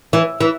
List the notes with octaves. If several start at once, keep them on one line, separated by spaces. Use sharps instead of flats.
E3
E3